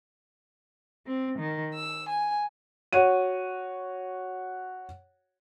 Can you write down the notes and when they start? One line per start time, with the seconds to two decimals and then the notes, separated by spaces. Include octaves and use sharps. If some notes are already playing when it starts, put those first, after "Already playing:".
1.07 C4
1.40 D#3
1.74 E6
2.09 G#5
2.93 F#4 C#5 F#5 D#7